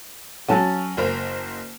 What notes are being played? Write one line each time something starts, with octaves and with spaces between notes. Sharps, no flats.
F#3 C#4 F#5 G#5 A5
F#1 A#4 C5